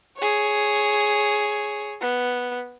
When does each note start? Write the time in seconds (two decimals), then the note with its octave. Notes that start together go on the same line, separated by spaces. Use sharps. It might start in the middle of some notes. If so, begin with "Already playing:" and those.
0.18 G#4 C#5
2.01 B3